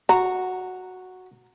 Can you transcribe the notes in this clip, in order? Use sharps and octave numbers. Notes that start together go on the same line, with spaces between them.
F#4 A#5